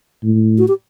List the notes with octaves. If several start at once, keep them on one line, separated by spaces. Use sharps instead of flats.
A2
F#4
G4